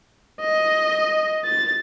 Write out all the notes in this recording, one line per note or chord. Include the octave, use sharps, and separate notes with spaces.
D#5
A6